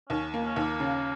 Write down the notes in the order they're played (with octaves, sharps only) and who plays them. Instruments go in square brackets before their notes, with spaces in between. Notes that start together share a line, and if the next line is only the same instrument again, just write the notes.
[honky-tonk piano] D#2 [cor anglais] C#4
[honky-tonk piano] A#3
[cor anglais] C#4
[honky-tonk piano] D#2
[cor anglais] A#3
[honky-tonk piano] C#3